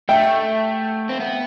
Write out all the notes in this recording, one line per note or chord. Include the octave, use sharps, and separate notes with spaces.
A3 E5 G5
C4
B3